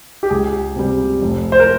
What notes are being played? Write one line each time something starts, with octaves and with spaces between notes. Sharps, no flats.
G4
C#2 G#4
C3 G3
F1
C5
A#4